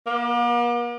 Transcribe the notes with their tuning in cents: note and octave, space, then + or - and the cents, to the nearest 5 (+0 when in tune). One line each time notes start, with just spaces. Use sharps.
A#3 +45